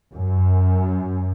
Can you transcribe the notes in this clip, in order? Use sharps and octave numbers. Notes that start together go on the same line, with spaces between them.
F#2